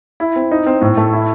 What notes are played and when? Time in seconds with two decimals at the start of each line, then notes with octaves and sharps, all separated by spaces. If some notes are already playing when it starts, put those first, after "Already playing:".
0.20 E4
0.36 C4
0.51 D#4
0.66 C4
0.82 A2
0.97 A3
1.13 E4